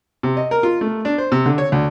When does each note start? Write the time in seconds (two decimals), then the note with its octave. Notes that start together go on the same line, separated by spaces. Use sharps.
0.23 C3
0.37 D#5
0.51 A#4
0.63 F4
0.81 A3
1.05 D4
1.18 C5
1.32 C3
1.46 D3
1.58 C#5
1.72 D2